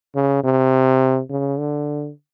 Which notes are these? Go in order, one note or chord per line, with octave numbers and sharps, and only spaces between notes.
C#3
C3
C#3
D3